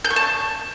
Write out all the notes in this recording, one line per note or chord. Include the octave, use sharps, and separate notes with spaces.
G6
C#6
A5